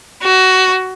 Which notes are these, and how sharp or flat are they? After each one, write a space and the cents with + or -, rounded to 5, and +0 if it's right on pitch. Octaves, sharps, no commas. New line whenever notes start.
F#4 +20